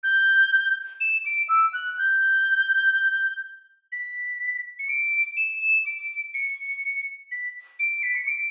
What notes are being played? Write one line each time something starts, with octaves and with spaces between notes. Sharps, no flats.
G6
E7
D7
E6
F#6
G6
B6
C#7
D7
E7
E7
D7
C#7
B6
D7
B6
C#7
D7